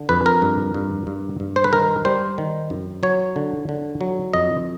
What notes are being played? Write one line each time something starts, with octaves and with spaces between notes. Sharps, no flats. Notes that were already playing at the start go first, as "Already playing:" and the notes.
Already playing: D3
F2 B4
A#4
G2
G2
G2
G2
C5
B4
D#3 A#4
G3 C5
D#3
F#2
F#3 C#5
D3
D3
F#3
F2 D#5